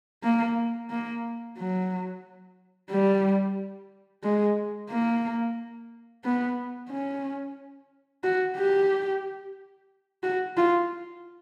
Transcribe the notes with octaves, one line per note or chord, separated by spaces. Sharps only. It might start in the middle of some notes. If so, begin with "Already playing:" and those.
A#3
A#3
F#3
G3
G#3
A#3
B3
C#4
F#4
G4
F#4
F4